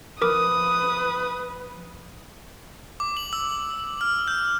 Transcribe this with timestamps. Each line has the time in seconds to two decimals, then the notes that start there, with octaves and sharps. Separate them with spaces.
0.22 F3 A#4 B4 D6 D#6
3.00 D6
3.17 F#7
3.33 E6
4.01 F6
4.28 G6